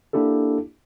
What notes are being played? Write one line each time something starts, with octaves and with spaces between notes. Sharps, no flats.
A#3 D4 E4 G4 A4